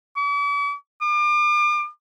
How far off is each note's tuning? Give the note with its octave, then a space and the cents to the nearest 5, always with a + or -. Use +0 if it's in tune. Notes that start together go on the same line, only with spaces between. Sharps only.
D6 -45
D6 +35